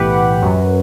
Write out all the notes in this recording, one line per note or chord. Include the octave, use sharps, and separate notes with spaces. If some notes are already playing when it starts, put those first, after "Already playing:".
Already playing: B1 A2 E3 G4 B4 F#5
F#2 F#3